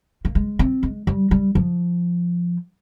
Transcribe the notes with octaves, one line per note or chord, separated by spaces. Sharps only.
A#3
G#3
C4
G#3
G3
G3
F3